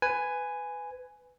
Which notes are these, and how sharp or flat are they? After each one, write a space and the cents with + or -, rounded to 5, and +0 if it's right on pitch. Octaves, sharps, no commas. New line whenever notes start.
B4 +20 G#5 +0